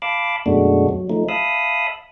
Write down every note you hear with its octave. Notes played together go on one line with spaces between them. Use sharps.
F5 A5 B5 D6
F#2 B2 G#3 A3 D4 F#4
F#3
F3 A3 D#4
E5 F5 A5 B5 D#6